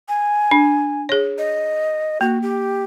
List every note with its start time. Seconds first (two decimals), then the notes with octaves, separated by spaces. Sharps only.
0.08 G#5
0.51 D4
1.09 G#4 C#5
1.38 D#5
2.21 A#3 F#4
2.42 G4